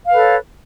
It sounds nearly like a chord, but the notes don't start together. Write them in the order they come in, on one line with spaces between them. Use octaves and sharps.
F5 B4 A4 C#5